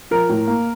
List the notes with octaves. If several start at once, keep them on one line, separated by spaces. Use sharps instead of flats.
F3 A#4
A2
A#3